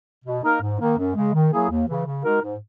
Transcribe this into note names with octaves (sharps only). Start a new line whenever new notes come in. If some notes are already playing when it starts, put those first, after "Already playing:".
B2
A#3 D#4 A#4
G#2
D#3 A#3
F#2
C#3 G#3
D#3
F#3 A#3 E4 G#4
D#2
C#3 E3
C#3
G#3 D#4 F#4 A#4
G#2